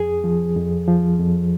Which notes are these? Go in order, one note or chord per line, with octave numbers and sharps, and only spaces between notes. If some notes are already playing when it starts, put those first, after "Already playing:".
Already playing: F2 G#4
F3
F2
F3
F2